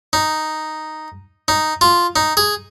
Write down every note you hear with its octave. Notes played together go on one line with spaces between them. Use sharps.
D#4
D#4
F4
D#4
G#4